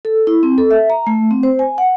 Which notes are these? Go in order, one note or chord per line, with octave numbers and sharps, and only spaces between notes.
A4
E4
C4
A4
E5
A#5
A3
C4
C5
G#5
F#5